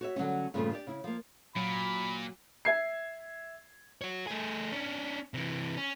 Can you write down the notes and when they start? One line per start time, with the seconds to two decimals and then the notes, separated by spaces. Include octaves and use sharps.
0.01 F#4 C#5 E5
0.16 D3 F#3 G3 C#4
0.54 G2 A#2 C#3 F3 G3 A3
0.72 D4 G4 D5
0.87 C#3 E4
1.04 F3 A#3
1.56 A#2 F#3 B5
2.65 E5 G#6 C7
4.02 F#4 C#5
4.27 A3 G#4
4.72 C#4 D4
5.34 C3 E3
5.77 C#4